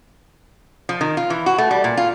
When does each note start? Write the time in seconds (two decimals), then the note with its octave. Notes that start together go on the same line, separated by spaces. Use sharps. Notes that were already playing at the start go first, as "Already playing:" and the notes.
0.89 F3
1.01 D#3
1.17 F4
1.30 E3
1.46 F#4
1.58 A3
1.71 G3
1.84 A#2
1.97 F4